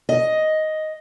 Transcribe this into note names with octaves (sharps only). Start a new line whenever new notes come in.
D#5